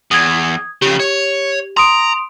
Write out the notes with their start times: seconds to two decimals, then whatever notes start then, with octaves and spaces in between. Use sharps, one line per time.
0.11 E2 D#6 G#6
0.82 F2 C#3 G4
1.00 C#5
1.77 A#5 C6 D#6 D7